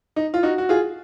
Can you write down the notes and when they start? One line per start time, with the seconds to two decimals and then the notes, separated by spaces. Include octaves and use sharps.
0.16 D#4
0.34 F4
0.43 D#4 F#4
0.58 F#4
0.69 F4 G#4